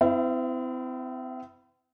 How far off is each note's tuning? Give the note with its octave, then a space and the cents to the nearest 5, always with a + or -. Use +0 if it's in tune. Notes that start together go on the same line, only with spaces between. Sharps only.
C4 -40 E4 +0 E5 +40